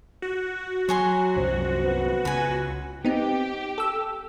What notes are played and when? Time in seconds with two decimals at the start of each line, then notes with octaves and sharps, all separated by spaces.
0.22 F#4
0.89 F#3 C#5 G#5 C6
1.37 C2 F#2 F3 C5
1.83 B3
2.25 C#2 B4 G#5
3.04 B3 C4 D#4 G4
3.78 A4 E6